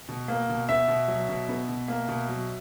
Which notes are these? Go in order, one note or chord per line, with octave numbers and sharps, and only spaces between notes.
B2
A#3
B2
B3 E5
B2
F#3
B2
B3
B2
A#3
B2
F#3